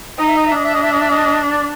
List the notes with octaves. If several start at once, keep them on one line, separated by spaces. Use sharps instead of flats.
D#4 D#5
E5
D#5
E5
D4 D#5
E5
D#5
E5
D#5
E5
D#5
D5